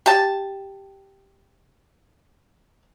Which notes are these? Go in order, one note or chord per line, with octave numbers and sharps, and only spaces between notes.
G4 A5